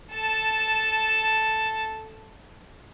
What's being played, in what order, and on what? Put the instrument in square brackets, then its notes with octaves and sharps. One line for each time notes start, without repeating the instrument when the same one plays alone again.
[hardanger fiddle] A4 A5